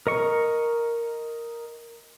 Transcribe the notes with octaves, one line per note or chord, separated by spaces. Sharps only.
A#4 D#5 C#6